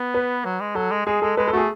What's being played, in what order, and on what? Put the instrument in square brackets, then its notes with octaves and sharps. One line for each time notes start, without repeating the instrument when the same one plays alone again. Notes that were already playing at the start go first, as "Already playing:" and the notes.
Already playing: [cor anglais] B3
[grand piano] B4
[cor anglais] F#3
G#3
[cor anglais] F#3 [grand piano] A4
[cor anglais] G#3
[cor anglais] G#3 [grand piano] G#4
[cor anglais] G#3 [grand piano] A4
[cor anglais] G#3 [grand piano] B4
[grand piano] A4
[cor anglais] A3 [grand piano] F#4
[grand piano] G#4